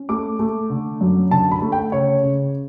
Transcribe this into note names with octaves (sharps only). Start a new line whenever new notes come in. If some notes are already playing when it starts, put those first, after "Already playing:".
Already playing: C#4
A3 D6
A3
D3
F#2
D3 A5
B5
A3
G5
C#3 C#5
C#3